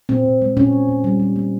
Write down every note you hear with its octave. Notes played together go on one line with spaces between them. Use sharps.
A#2 C4
A#2
G#3
A#2 C#4
G#3
A#2
G3
G3
A#3